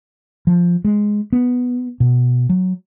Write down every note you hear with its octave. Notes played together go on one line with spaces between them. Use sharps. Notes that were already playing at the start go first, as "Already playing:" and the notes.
F3
G#3
B3
B2
F#3